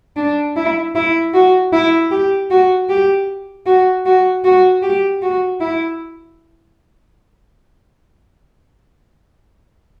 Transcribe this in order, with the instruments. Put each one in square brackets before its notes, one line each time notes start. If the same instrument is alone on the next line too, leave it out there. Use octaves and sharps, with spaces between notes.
[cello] D4
E4
E4
F#4
E4
G4
F#4
G4
F#4
F#4
F#4
G4
F#4
E4